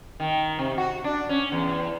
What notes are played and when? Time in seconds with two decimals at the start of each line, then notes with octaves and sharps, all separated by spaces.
0.20 D#3
0.59 C3
0.78 F#4
1.04 D4
1.29 C#4
1.52 E2